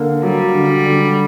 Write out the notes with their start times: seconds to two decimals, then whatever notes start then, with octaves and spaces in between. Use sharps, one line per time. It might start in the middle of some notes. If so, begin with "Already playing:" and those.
Already playing: D3 A#3
0.23 F#3 G3
0.55 D3
0.87 D3